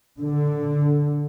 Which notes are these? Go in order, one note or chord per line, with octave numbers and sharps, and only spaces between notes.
D3